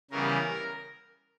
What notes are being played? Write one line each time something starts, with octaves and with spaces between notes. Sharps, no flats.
C#3 E3 G3 B3 A#4